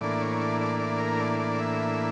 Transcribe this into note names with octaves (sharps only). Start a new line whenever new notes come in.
A2 E3 A#3 D4 D5
C#5
D5
D5
D5
A#4
D5
D5
E5